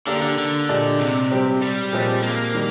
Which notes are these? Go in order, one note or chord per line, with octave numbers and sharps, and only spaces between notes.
D3 A#3 D4 G4 A#4
D3
D3
A#2 G#3 D4 G4
C3
G3 C4 G4
G3
A#2 F3 G#3 C4 G4
A#3
D#3 G3